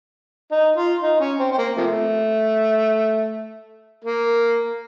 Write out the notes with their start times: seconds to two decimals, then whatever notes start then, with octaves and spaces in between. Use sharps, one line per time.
0.52 D#4
0.77 F4
1.02 D#4
1.20 C#4
1.39 C4
1.52 C4
1.58 A#3
1.77 C3 F3 A3
4.05 A#3